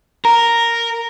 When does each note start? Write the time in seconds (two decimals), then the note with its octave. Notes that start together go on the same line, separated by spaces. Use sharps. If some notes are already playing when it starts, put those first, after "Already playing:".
0.25 A#4 A#5